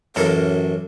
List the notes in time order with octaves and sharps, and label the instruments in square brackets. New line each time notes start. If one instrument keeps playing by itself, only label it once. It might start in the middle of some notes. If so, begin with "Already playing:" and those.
[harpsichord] A1 A4 [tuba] F#2 [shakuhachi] A#4